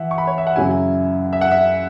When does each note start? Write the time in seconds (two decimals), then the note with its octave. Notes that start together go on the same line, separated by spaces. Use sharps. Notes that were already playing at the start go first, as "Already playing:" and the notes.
Already playing: E3 E4 E5 F#5
0.11 C#6
0.18 B5
0.27 C#5
0.38 E5
0.47 F#5
0.56 F#2 C#3 F#3 E4 G#5
1.33 E5
1.41 F#5
1.51 E5